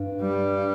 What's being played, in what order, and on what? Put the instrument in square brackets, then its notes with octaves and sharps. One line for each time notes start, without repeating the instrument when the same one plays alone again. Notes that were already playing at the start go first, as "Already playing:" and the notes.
Already playing: [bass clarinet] G2
[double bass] G3